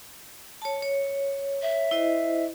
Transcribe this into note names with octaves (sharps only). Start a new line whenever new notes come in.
C#5 A5
C#5
E5
E4 C5 D#5